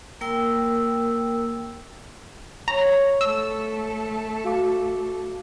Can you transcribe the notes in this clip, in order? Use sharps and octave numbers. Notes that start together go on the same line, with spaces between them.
A#3 A#4 G5 E6
C#5 A#5
A3 A4 E6
F#4 F5 D6